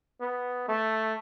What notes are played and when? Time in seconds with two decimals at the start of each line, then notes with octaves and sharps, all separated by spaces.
0.21 B3
0.68 A3